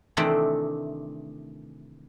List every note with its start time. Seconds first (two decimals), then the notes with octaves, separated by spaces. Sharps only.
0.17 C3 D#3 E3 A3 C4 D4